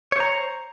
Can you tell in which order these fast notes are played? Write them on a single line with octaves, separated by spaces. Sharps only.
C#5 C5 A#5